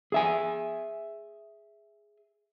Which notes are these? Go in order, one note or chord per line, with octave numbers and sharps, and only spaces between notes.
G#4 E5 G#5